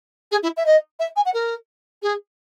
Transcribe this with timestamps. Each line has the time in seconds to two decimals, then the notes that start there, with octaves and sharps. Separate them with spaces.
0.32 G#4
0.43 E4
0.57 E5
0.66 D#5
0.99 E5
1.16 G#5
1.25 F#5
1.34 A#4
2.02 G#4